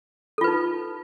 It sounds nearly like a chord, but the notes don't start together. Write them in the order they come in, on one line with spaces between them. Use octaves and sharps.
A4 F4 B4 D#4